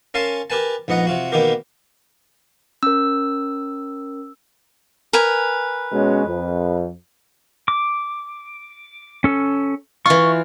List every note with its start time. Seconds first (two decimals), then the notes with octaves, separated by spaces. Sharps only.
0.14 C#4 A#4 F5 G#5 A5 C6
0.50 G4 A#4 B4 G#5 A5
0.88 A#1 G#2 B3 D#5 F#5 A#5
1.07 C3 F4 F#4
1.32 B2 D#3 A#3 B3 G4 A#4
2.83 C#4 A#4 E6
5.13 A#4 B4 G#5
5.92 B2 G#3 C#4
6.26 F2
7.68 D6
9.24 C#4 A4
10.06 E3 F4 C#6